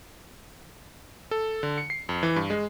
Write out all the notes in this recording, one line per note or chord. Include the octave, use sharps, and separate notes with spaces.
A4
D3
C#7
C7
F2
E3
G2
G#3